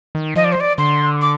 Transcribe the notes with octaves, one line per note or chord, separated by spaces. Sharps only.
D#3
F3 D#5
D5
C5
D5
D3 C6
D6